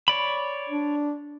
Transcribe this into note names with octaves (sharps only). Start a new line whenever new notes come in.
C#5 D5 B5
D4